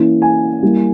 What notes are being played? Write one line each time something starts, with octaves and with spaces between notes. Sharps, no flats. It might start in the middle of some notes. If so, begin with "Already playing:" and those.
Already playing: E3 A#3 C#4 E4
G#5
G3 A#3 E4